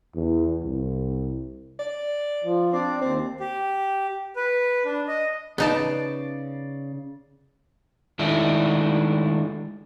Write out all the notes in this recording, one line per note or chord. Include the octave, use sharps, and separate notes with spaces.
E2
C2
D5
F3
C4 D4 D5
D#2 C4
G4
B4
D4
D#5
C#3 B3 D#4 D5 A5
D#3 G#3 A3 D4 E4